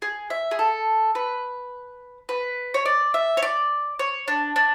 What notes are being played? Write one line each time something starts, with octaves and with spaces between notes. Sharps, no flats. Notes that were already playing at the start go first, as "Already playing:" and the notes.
G#4
E5
G#4
A4
B4
B4
C#5
D5
E5
C#5
D5
C#5
D4
D4